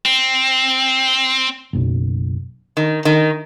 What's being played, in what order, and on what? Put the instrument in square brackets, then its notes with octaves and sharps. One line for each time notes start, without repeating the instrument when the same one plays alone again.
[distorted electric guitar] C4
[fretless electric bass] F#1 B1
[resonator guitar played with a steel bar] D#3
D#3